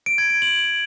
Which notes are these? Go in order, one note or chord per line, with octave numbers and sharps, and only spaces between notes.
D7
G#6
D7
F#7